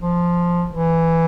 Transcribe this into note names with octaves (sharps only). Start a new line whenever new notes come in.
F3
E3